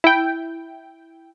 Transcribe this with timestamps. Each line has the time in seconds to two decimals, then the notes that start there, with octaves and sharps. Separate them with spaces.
0.04 E4 G5